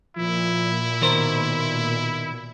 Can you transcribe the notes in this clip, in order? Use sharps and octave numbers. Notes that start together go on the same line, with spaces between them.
A#2 F3 E4
B2 D#3 A#4 C5